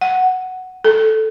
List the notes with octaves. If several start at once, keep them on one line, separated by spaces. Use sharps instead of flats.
F#5
A4